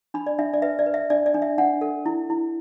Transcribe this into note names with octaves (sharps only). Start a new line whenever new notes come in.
D4 B5
D5
D4 E5
D5
B4 E5
D5
B4
E5
D4 D5
D5
D4
E5
D4 F#5
A4
E4
E4